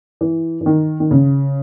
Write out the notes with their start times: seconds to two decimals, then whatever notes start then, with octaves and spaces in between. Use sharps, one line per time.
0.21 E3
0.61 E3
0.66 D#3
1.00 D#3
1.11 C#3